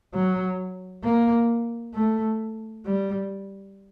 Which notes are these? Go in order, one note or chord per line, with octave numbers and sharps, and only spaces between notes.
F#3
A#3
A3
G3